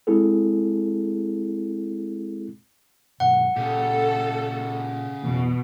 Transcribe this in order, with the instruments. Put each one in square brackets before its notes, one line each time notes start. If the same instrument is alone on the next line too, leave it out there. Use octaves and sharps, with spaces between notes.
[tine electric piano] G#3 C4 E4 G#4 A4
[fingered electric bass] G2 B2 F#3 [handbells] F#5
[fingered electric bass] A#2 [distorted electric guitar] C#3 G4 [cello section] A4
[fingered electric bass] F2 E3 [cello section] B2